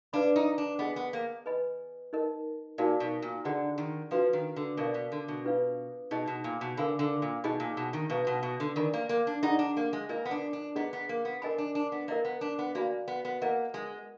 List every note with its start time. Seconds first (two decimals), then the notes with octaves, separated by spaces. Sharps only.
0.13 D4 B4 D5 F5 B5
0.36 D#4
0.58 D4
0.79 B3 G#4 D#5 G#5 B5
0.96 B3
1.13 A#3
1.46 B4 D#5 G#5 B5
2.13 D#4 A#4 D#5
2.78 A#2 D#4 F#4 A#4 D5 F5
3.00 B2
3.22 A#2
3.45 D3 D4 G#4 D5 F#5 A#5
3.78 D#3
4.11 F3 D4 F#4 B4 F5
4.33 D#3
4.56 D3
4.77 B2 A#4 D5 F5
4.94 B2
5.12 D3
5.28 B2
5.45 D4 F4 B4 F5
6.11 B2 D#4 G#4 D#5
6.27 B2
6.44 A#2
6.61 B2
6.77 D3 A#4 F5 G#5 B5
6.99 D3
7.22 A#2
7.44 B2 D#4 G#4 D#5 G#5 B5
7.60 A#2
7.77 B2
7.93 D#3
8.10 B2 B4 F5 A#5
8.27 B2
8.43 B2
8.60 D3
8.76 D#3 A#4 D5 G#5 B5
8.94 A#3
9.09 A#3
9.27 D4
9.43 D#4 G#4 D5 F#5 B5
9.59 D4
9.77 A#3
9.93 G#3
10.09 A#3 F4 A#4 D#5 G#5
10.25 B3
10.31 D4
10.53 D4
10.76 B3 D4 G#4 D#5 A#5
10.93 B3
11.09 A#3
11.25 B3
11.42 D4 A#4 D#5 G#5 B5
11.58 D4
11.75 D4
11.92 B3
12.08 A#3 A#4 D#5 A#5
12.25 B3
12.41 D4
12.59 B3
12.75 A#3 F#4 D5 F5 G#5 B5
13.08 B3
13.25 B3
13.42 A#3 A#4 D#5 F#5 A#5
13.74 G#3